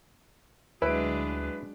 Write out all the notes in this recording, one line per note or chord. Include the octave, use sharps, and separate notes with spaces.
D2 F#3 G#3 D4 E4 B4 D7